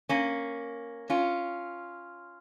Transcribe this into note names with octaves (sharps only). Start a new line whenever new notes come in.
A#3 C#4
C#4 F4